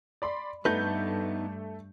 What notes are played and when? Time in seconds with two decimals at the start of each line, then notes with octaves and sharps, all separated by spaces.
0.22 D5 B5 C6
0.65 G2 A3 B3 D#4 B4 G6